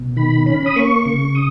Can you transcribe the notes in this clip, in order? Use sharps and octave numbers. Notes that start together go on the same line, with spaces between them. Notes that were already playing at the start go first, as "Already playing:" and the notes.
Already playing: B2
D#3 B5
C#4 B5
D#6
A#3 C#6
C#3 C#6
D#6